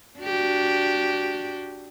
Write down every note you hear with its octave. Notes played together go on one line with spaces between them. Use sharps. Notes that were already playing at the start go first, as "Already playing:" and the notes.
D4 F#4 G4